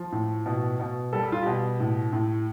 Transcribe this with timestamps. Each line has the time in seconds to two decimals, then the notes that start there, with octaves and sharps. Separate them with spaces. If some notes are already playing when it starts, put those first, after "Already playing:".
Already playing: F3
0.12 A2
0.46 B2
0.79 B2
1.13 G3 A4
1.23 G4
1.32 F4
1.43 B2 G4
1.80 A2
2.13 A2